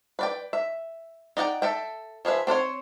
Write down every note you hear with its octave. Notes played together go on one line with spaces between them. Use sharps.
B4 D5 G5
E5
D#4 D5 F#5 G5
A4 E5 G5
F3 G#4 B4 E5
C4 D4 C5 C#5